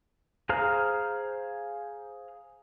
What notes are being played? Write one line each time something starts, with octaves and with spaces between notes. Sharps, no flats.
G#4 C5 F5 A#5 F6